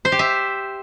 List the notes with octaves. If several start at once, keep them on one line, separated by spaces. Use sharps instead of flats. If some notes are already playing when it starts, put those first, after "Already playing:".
C5
G4
E5